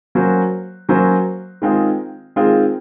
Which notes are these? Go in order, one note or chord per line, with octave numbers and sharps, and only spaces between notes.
F#3 A#3 C#4 F#4 C5
F#3 A#3 C#4 F#4 C5
D#3 G#3 C4 F4 G#4
D#3 G#3 C4 F4 G#4